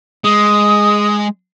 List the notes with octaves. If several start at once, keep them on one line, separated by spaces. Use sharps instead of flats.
G#3 D#6